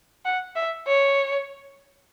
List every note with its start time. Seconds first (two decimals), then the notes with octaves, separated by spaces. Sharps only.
0.25 F#5
0.56 E5
0.87 C#5